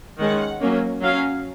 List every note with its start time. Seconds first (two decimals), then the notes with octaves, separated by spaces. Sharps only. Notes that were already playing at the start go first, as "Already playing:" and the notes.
0.18 D#3 G#3 C#4 F#5
0.60 F#3 A#3 C#4
1.01 F#3 C#4 F5